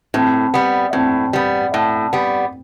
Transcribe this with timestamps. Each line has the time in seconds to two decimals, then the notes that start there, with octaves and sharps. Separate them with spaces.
0.14 A2 C4
0.54 G3 B3
0.93 A2 C4
1.33 G3 B3
1.74 A2
2.13 G3 B3